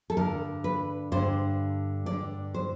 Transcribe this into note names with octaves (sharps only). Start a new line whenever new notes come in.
A4
G2 D3 A#4
B4
G2 D3 C5
G2 D3 D5
C5